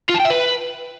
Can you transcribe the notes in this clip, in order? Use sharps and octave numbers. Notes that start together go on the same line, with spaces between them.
F4
A5
G5
E5
B4